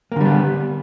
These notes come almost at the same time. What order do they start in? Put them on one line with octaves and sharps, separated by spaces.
A#3 D3 G3 B3